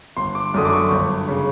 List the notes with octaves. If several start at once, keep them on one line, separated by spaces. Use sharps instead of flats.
G1 C6
D6
F#2 D3 D#6
D6
C#6
G1
C#3